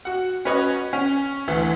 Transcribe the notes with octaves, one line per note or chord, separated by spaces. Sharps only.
F#4 F#5
C#4 F#4 B4 C#5 D#5
C#4
D2 E3 A3 A4